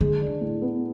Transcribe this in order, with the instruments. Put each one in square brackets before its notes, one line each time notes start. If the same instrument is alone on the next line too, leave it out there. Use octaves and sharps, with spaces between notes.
[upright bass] D3 [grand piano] G#3
[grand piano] D4
A2
B3